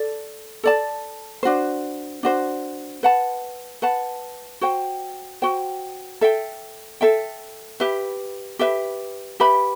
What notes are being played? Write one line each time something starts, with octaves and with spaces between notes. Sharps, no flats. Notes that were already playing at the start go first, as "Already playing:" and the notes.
Already playing: A4 D5
A4 D5 A5
D4 F#4 C5
D4 F#4 C5
B4 F#5 A5
B4 F#5 A5
F#4 C5 G5
F#4 C5 G5
A4 E5 G5
A4 E5 G5
G4 B4 E5
G4 B4 E5
G4 B4 E5 B5